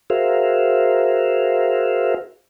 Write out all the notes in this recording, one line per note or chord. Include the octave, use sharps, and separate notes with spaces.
F#4 G#4 A#4 C5 E5 F5